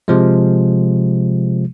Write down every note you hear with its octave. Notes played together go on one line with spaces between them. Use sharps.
C3 F3 G#3